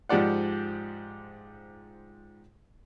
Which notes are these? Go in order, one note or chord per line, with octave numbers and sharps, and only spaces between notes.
G#2 F3 G4 D5 F#5